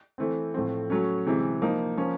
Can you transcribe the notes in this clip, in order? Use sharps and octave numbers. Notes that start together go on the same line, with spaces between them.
E3 A3 C4
A2 F3 A3 C4
F#3 A3 C#4
C3 E3 G#3
F3 A#3 D#4
F3 A#3 C#4